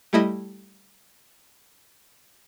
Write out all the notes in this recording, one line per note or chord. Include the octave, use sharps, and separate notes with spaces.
G3 A3 E4 D#5